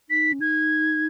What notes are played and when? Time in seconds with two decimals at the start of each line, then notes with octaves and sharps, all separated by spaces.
0.09 D#4 B6
0.33 C#4
0.40 D#4 G#6